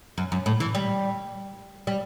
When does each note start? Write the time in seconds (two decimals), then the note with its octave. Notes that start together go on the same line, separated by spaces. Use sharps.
0.18 F#2
0.32 F#2
0.46 A2
0.60 E3
0.75 G3
1.87 G3